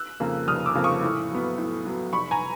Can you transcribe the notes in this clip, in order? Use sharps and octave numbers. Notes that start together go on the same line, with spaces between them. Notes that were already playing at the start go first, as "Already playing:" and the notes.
Already playing: E6 F#6
F2 C#3 F3 A#3
F1 D#6 F6
D6 E6
F2 C#3 F3 A#3
C#6 D#6
A2
F#3 B3
A2
F#3 B3
F1 B5 C#6
G#5 A#5